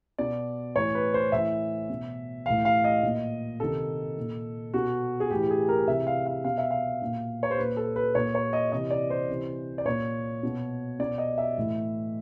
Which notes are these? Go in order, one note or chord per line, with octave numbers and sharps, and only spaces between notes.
B2 D5
A2 E3 C#5
B4
C5
A2 E3 E5
B2
A2 E3 F5
F5
D#5
A#2
C3 D#3 A4
A#2
B2 F#4
G#4
A2 E3 G4
G#4
A#4
C3 E3 E5
F5
F5
B2 F5
E5
F5
A#2
C#5
C5
A#2 B4
A4
B4
A#2 C#5
C#5
D#5
C3 E3 D#5
D5
C5
C3 E3
D5
A#2 C#5
B2
B2 D5
D#5
E5
A2 E3